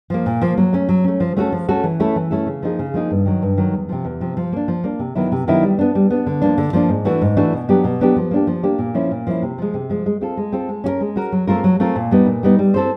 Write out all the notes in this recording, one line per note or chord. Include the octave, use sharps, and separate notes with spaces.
F3 A#3
A#2
F3 A#3
F#3
A3 C#4
F#3
A3 C#4
F3
A3 C#4 F#4 A4
F3
A3 C#4 F#4 A4
E3
A3 C#4 E4 A4
E3
A3 C#4 E4 A4
C#3
F3 A#3 D#4 G#4
C#3
F3 A#3 D#4 G#4
G2
D#3 F#3
G2
D#3 F#3
E2
C3 F3
E2
C3 F3
F3
A#3 D4
F3
A#3 D4
C3
D#3 F#3 B3 E4
C3
D#3 F#3 B3 E4
G3
B3 D4
G3
B3 D4
D3
F3 A#3 D4
D3
F3 A#3 D4
G#2
E3 A3 D4 F#4
G#2
E3 A3 D4 F#4
B2
F#3 B3 D4 G4
B2
F#3 B3 D4 G4
F3
A#3 D4 G4
F3
A#3 D4 G4
A#2
F3 A#3 C#4 E4
A#2
F3 A#3 C#4 E4
C3
F3 G#3
C3
F3 G#3
G#3
C4 F4 A4
G#3
C4 F4 A4
G#3
C#4 F#4 A#4
G#3
C#4 F#4 A#4
F#3
A3 C4 F4 A#4
F#3
A3 C4 F4 A#4
A#2
G3 B3 D#4
A#2
G3 B3 D#4
G3
C4 E4 A4 C5